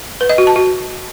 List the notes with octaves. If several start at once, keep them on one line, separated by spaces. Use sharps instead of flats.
B4
D#5
F#4
A5
F#4